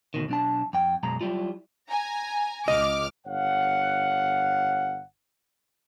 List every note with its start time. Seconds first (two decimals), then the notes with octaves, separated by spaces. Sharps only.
0.14 D2 B2 D#3
0.29 B1 D4 A5
0.73 F2 G5
1.03 F#2 B2 G#3 A#5
1.21 F#3 G3 E4 F4
1.89 G#5 A#5
2.68 C#2 D#5 D6 F6
3.26 G1 C#5 F5 F#5